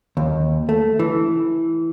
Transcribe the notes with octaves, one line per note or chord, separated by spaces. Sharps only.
D#2
A3
E3